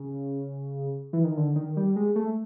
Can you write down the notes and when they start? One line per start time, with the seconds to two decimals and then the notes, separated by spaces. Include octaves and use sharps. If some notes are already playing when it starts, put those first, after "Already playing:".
Already playing: C#3
1.13 E3
1.24 D#3
1.37 D3
1.56 D#3
1.77 G3
1.96 G#3
2.16 A3